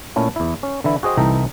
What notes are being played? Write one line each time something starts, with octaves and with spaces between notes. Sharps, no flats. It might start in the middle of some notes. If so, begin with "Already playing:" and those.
A#2 A3 C#4 E4 A4
E2 E4
C#4
D3 E3 E4
F#4 G#4 C5 D#5 G5
C2 E3 D#4 A4 G5 A#5